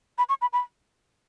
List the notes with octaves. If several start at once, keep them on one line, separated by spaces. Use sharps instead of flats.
B5
C#6
B5
B5